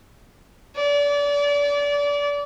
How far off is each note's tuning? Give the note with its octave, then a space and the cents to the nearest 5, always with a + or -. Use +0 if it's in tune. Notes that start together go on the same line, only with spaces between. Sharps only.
D5 -30